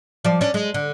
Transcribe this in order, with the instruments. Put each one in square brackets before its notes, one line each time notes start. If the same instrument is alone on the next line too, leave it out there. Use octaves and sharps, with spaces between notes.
[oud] F3 D5
C#4 D4
G#3
D3